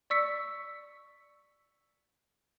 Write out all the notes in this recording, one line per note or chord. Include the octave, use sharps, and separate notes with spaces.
D5 C#6 E6 B6 C#7